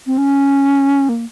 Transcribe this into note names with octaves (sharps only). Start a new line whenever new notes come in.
C4
C#4
A#3